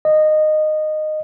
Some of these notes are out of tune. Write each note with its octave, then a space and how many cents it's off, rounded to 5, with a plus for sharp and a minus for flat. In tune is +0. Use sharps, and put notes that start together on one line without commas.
D#5 -15